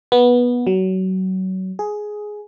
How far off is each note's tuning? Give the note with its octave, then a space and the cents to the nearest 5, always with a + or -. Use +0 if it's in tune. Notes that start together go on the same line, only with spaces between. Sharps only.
B3 -15
F#3 +25
G#4 +10